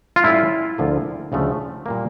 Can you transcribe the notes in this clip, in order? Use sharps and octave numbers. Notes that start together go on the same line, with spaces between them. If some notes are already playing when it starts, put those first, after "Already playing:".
F4
A2 G3 C#4 E4
D2 D3 F3 A#3
D2 C#3 F3 A3
A#2 G3 A#3